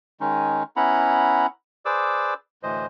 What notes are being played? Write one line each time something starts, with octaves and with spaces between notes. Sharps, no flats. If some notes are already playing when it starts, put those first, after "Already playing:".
D#3 G#3 C#4 D#4
B3 C#4 E4 F#5 A#5 B5
G#4 B4 C5 D5 D6 E6
D2 A2 E3 C5 D#5